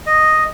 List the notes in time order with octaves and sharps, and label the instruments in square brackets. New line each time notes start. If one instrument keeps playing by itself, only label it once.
[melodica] D#5